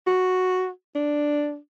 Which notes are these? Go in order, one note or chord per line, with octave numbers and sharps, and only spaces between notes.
F#4
D4